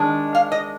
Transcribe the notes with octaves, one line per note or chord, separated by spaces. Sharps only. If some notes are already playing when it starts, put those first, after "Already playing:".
Already playing: D#3 G#3 D4
F5
D#5